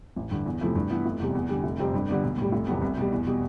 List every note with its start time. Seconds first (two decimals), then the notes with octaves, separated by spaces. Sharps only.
0.16 A1
0.31 G2 D3
0.46 E2
0.61 C3 F3 A3 E4
0.75 G2
0.90 E3 B3 E4
1.06 F1
1.20 E2 C3 G3
1.35 E2
1.49 D3 G3
1.64 F1
1.79 F2 C3 G3 C4
1.94 G2
2.09 D3 G3 B3 D4
2.23 B1
2.38 A2 G3
2.52 F1
2.67 E2 C3 G3 B3
2.82 C2
2.97 B2 G3
3.12 E2
3.27 B2 G3